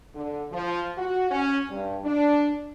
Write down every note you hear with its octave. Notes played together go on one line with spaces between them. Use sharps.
D3
F3
F#4
C#4
G2
D4